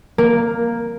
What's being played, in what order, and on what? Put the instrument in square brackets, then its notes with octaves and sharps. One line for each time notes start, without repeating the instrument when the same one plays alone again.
[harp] A#3